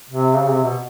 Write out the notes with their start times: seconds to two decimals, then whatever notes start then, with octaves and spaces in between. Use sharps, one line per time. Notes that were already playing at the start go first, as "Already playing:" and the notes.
0.10 C3
0.37 C#3
0.51 C3
0.63 B2